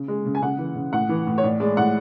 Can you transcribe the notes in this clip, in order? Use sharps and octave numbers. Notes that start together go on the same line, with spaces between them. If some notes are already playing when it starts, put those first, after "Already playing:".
Already playing: C#3
G#3
C#3
G#5
C#3 F#5
E3
C#3
A2 F#5
E3
A2
C#5
A2 D5
G#3 D5
A2 F#5